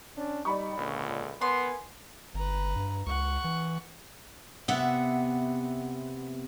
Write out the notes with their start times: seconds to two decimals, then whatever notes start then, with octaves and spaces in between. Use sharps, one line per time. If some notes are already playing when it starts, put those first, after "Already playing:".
0.16 C#4 D4
0.45 G3 D#4 D5 B5 C#6
0.78 C#2 A#2 D3
1.41 B3 A#4 B4 G#5 C6
2.34 G1 B4 A#5
2.76 G2
3.06 C#2 F#5 C#6
3.44 E3
4.68 C3 B3 E5 F#5